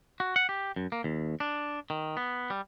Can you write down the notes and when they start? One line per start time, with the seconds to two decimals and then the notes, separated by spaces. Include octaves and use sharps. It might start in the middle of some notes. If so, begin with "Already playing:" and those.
0.20 F#4
0.36 F#5
0.49 G4
0.76 F#2
0.92 A#3
1.04 D#2
1.40 D4
1.90 D#3
2.17 B3
2.50 G3